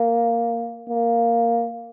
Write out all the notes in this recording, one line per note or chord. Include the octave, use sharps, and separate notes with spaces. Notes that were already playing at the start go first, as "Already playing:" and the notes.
Already playing: A#3
A#3